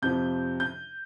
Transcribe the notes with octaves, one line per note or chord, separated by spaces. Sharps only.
F2 C3 F3 G6
G6